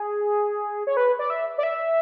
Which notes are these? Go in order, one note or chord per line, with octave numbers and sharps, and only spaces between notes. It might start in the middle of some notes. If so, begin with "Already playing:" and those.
Already playing: G#4
C#5
B4
D5
E5
D5
E5